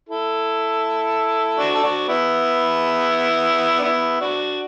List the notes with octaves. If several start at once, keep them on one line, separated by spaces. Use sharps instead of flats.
E4 A4
D4 F#4
A4
D4 F#4
B3 E4
D4
B3 E4
D4 F#4